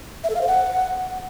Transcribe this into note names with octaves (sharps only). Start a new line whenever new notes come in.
E5
A4
F5
C5
F#5